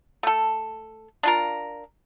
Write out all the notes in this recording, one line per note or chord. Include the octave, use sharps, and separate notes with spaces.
A3 A4
D4 F4 A#4